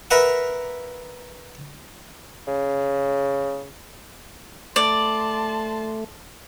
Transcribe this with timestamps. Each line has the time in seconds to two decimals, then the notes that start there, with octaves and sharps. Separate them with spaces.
0.11 A#4 B4 E5 F#5
2.48 C#3
4.76 A3 D5 A5 C6